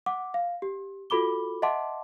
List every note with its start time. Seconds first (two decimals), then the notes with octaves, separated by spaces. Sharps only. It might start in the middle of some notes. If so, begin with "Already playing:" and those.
0.06 F#5 D6
0.34 F5
0.62 G4
1.10 F4 F#4 A4 B5 D6 G7
1.62 D#5 E5 F#5 A5 C6 D6